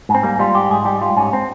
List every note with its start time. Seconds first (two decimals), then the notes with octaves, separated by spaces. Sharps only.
0.09 G#2
0.15 C4
0.23 G3 A#3
0.40 G3 F4
0.55 G#2 G4
0.70 G#2 G#4
0.85 G3 G4
1.01 G3 F4
1.17 G#2 C#4
1.33 C4